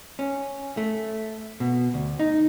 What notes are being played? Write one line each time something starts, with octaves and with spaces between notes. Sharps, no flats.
C#4
A3
B2
D2
D#4